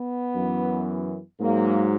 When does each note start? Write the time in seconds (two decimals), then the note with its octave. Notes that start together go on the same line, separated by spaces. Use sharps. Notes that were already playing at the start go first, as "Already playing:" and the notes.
Already playing: B3
0.34 F#2 E3
1.39 G#2 F#3 A#3